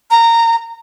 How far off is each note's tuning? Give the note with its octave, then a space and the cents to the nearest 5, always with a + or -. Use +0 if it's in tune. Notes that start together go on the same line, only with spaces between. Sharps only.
A#5 -20